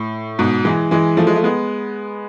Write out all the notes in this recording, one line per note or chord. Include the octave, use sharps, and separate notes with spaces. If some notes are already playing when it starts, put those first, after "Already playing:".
Already playing: A2
G#2 B2
E3 G#3
E3 G#3
F3 A3
G#3
A3
G#3 B3